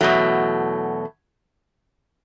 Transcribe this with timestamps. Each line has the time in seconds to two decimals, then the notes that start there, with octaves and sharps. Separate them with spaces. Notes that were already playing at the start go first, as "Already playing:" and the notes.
0.01 E2 B2 F#3 A3